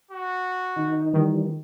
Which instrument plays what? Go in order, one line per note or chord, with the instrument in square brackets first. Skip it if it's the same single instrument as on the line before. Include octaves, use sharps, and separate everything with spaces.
[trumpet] F#4
[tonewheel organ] D#3 D#4
[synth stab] D#3 [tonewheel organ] E3 G3